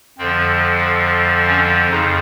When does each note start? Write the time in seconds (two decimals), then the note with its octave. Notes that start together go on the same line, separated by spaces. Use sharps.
0.18 F2 D3 F3 C4
1.47 C#4
1.90 F2 C#3 D#4